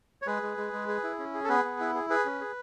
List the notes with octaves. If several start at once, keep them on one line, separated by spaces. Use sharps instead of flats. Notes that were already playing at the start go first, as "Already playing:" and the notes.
C#5
G#3 G#4 B4
G#3
G#3
G#3
G#4
E4
C#4
G#4
A4
B3 G#4 B4
B3
E4
G#4
G#4 B4
C#4
G#4